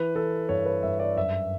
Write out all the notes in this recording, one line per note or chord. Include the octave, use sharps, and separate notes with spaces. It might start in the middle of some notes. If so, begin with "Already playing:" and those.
Already playing: E3 B4
E3 A4
G2 C#5
B4
G2 E5
D5
F#2 E5